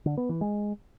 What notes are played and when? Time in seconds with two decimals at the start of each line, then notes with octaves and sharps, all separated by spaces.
0.06 D3
0.17 B3
0.29 E3
0.41 G#3